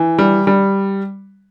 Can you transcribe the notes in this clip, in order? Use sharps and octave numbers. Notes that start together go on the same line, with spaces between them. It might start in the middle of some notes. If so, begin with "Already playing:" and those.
Already playing: E3
G3
G3